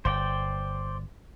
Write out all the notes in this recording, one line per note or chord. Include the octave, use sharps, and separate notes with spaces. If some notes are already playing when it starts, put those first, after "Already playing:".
G1 C5 D5 G5